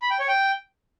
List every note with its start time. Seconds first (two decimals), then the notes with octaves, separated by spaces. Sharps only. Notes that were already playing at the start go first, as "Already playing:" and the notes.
0.02 B5
0.11 G5
0.19 C#5
0.28 G5